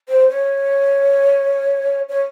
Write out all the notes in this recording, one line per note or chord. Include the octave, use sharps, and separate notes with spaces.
C5
C#5
C#5